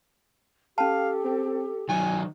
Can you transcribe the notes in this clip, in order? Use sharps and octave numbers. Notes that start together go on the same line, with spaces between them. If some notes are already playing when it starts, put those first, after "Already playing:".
C#4 G4 A4 F5 A5
C4
D#3 F#3 G#5